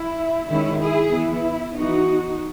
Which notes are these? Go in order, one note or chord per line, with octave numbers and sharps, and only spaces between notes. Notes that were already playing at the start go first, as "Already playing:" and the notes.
Already playing: E4
D#3 G#3 C#4 E4
E4 G#4
E3 B3 E4
E3 B3 D#4 F#4